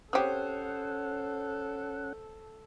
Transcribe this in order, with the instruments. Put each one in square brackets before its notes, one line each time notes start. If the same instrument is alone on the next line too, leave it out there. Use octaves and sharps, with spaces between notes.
[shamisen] C4 G4 [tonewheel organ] C#4 F#5 [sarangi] A4 [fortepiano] C5 C#5 D#6